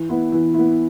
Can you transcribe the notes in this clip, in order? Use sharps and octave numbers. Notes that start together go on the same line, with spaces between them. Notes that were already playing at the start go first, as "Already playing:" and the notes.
Already playing: E3
B3 E4
E3
B3 E4